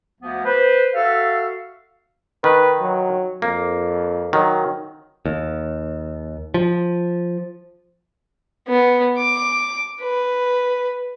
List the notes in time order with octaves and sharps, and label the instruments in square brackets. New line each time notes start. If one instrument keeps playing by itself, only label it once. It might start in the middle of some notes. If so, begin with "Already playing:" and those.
[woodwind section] D2 F3 A#3 B3
B4 C5
F#4 A4 E5 F5
[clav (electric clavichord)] D#3 [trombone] B4
[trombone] F#3
[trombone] F2 [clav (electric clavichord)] A#3
[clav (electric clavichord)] D#3 F#3
[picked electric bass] D#2
F3
[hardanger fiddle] B3
D6
B4